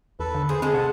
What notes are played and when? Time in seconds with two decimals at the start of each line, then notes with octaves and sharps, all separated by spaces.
0.20 E2 A4 B4
0.34 D3
0.49 G#4 B4 C5
0.62 G#3 C4 G#4 A4
0.74 C3 F#5 A5